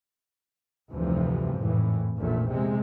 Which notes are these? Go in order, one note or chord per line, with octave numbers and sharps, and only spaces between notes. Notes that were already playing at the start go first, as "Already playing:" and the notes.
F1 D2 G2 C3 E3 F3
G#1 F2 A2 E3
F1 A#1 E2 A#2 A3
C3 G#3